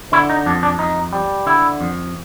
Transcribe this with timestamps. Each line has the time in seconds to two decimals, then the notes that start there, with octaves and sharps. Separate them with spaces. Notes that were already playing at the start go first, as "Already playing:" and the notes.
0.12 D3 E4
0.30 D#4
0.46 F2 D4
0.63 D4
0.79 F2 D#4
1.13 G3
1.46 D3 E4
1.81 F2